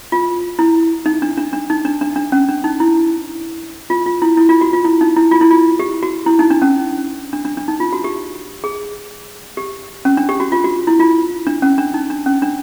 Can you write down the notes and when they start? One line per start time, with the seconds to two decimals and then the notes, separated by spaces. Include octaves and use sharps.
0.12 F4
0.59 E4
1.06 D#4
1.22 D4
1.37 D4
1.53 D4
1.70 D#4
1.85 D4
2.01 D4
2.16 D4
2.32 C#4
2.49 D4
2.64 D#4
2.80 E4
3.90 F4
4.06 F4
4.22 E4
4.37 E4
4.49 F4
4.61 F#4
4.73 F4
4.85 E4
5.01 D#4
5.17 E4
5.31 F4
5.41 E4
5.50 F4
5.80 G4
6.03 F#4
6.26 E4
6.39 D#4
6.50 D4
6.62 C#4
7.33 D4
7.45 D4
7.57 D4
7.68 D#4
7.80 F4
7.93 F#4
8.04 G4
8.64 G#4
9.57 G4
10.05 C#4
10.17 D4
10.29 G4
10.40 F#4
10.52 F4
10.64 F#4
10.87 E4
11.00 F4
11.47 D4
11.62 C#4
11.78 D4
11.94 D#4
12.10 D4
12.26 C#4
12.42 D4